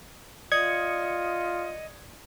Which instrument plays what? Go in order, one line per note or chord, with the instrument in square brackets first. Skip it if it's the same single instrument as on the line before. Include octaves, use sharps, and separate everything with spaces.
[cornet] F4 [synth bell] D5 D#6 C#7 [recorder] D#5 [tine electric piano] G#6